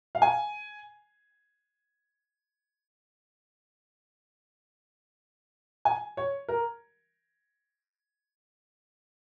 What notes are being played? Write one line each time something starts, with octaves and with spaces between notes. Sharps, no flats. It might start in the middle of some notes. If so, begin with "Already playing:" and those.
F5
G#5
G#5
C#5
A#4